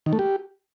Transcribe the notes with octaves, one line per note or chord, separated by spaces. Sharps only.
D#3
A3
G4